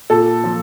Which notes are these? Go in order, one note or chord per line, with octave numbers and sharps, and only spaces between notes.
A#2 A4
F3